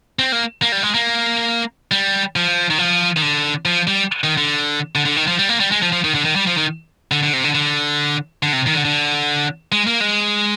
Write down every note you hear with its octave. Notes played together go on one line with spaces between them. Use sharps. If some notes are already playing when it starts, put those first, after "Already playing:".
C4
A#3
A#3
G3
G#3
A#3
G3
F3
D#3
F3
D#3
D3
F3
G3
D#3
D3
D3
D3
D#3
F3
G3
A#3
G3
G#3
F3
F3
D#3
D3
D#3
G3
F3
D#3
D3
D3
C3
D3
D3
D3
C3
D#3
D3
D3
G#3
A#3
G#3